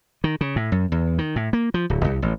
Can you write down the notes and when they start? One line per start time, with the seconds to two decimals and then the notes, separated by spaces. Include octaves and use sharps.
0.24 D#3
0.41 C#3
0.56 A2
0.72 F#2
0.92 E2
1.18 D#3
1.36 A2
1.53 A#3
1.74 F3
1.90 D1
2.04 C2
2.22 A1